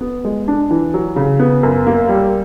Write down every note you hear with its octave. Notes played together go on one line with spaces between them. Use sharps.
B3
G#3
D4
E3
F#3
C#3
B3
F#2
A#3
G3